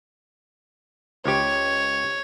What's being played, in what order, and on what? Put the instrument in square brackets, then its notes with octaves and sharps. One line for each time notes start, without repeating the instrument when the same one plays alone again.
[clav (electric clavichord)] C#2 G4 [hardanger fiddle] C#5